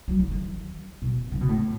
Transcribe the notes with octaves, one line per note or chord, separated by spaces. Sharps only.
F#3
E3
E3
B2
C#3
B2
A2